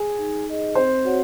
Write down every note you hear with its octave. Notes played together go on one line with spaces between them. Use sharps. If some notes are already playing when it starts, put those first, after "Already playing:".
Already playing: G#4
D#4
G#4 D#5
C4 C5
F#4 C#5 F#5